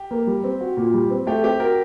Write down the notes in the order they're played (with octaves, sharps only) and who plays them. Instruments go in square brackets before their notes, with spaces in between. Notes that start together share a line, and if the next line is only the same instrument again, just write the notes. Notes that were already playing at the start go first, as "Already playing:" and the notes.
Already playing: [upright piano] G4
[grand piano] A#3
G3
C4
F#4
A#2
G3
C4
[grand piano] A3 [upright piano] G4
[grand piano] C4 [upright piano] G4
[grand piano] F#4 [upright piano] A#4